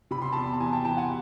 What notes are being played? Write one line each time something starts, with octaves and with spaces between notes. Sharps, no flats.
C3 B5
C6
E2 A5 B5
A5
E3 G#5 A#5
G5 A5
E3 G5 A5
F#5 G#5